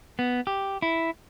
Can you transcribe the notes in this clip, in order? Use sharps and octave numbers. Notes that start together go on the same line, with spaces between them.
B3
G4
E4